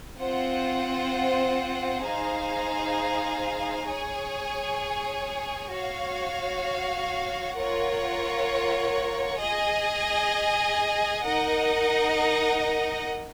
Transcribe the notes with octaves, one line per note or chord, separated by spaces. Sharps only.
C4 F4 C5 F#5
D#4 G#4 C5 F5
G#4 C#5 G#5
F#4 C#5 F5
F4 A#4 C#5 F#5
G#4 D#5 G#5
D#4 A#4 D#5 F#5